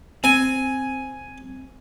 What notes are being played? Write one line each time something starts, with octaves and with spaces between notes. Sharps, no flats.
C4 G#5